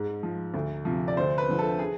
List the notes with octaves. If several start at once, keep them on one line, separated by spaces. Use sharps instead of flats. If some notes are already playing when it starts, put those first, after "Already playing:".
Already playing: G#2
F3
D2
C3 F3
D5
D2 C5
B4
D3 F3
A4
G#4